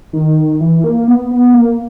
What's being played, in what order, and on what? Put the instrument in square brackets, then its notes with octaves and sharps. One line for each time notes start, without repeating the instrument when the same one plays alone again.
[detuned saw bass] D#3
E3
A#3
B3
B3
A#3